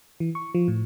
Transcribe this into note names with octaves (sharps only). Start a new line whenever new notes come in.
E3
C#6
F3
A2